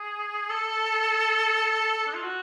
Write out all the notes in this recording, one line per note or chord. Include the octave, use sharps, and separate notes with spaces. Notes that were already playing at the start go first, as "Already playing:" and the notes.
Already playing: G#4
A4
D4
F4
F#4